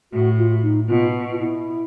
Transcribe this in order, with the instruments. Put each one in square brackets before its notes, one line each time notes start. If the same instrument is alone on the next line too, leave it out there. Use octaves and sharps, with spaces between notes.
[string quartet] A2 [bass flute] F#4
[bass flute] F4
D#4
[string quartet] B2 [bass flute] F4
[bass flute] F4
E4